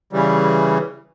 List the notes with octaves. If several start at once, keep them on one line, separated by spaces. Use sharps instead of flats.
C#3 E3 G3